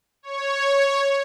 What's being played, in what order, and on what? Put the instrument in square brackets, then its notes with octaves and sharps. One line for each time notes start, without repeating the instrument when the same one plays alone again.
[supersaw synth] C#5